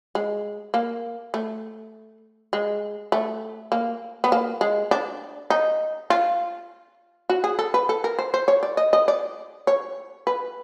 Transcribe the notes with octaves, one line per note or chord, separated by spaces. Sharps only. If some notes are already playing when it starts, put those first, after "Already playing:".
G#3
A#3
A3
G#3
A3
A#3
B3
A#3
G#3
D4
D#4
F4
F#4
G#4
A4
B4
A4
A#4
C5
C5
C#5
D5
D#5
D#5
D5
C#5
B4